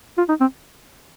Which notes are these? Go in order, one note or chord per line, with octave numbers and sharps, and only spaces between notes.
F4
D#4
C4